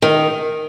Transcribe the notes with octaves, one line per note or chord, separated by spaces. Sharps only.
D#3